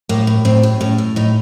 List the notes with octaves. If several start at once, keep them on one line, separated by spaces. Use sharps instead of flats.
A2 A#3
A2
A2 C4
A2
A2 C#4
A2
A2 D#4